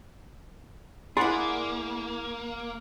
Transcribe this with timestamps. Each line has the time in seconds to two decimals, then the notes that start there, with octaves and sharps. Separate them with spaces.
1.17 A#3 E4 G#4 D5 F#5 C6